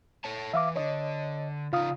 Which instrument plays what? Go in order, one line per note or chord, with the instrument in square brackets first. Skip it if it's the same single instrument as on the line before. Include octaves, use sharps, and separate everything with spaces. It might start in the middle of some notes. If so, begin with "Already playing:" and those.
[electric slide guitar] A4 C#5 A5
[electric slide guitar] E3 [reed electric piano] E5 F5 D6
[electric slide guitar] D3 [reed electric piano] C#5 D#5
[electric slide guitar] C#3 D#4 [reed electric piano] F4 F5 D#6